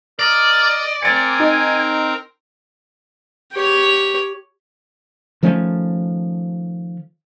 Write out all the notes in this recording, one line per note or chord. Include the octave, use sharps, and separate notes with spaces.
A#4 D5 D#5
C4 A#4 G#5 A6 C#7
D#4
G4 C#5
D#3 F3 A3 C#4